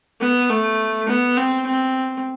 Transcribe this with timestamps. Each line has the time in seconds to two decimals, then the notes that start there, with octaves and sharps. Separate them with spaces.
0.21 B3
0.49 A3
1.08 B3
1.37 C4
1.66 C4